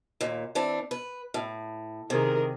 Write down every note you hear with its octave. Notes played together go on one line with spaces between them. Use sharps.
D#2 A#2
E3 C4 D4
B4
A2
C3 D#3 G#4 A#4